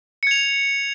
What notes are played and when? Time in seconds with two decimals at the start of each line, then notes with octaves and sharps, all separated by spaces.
0.23 C#7
0.27 G#6
0.31 F7